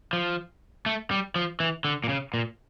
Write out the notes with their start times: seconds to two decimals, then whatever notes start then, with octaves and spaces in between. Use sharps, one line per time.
0.13 F3
0.86 A3
1.11 G3
1.36 F3
1.60 E3
1.85 D3
2.04 A#2
2.09 C#3
2.34 A#2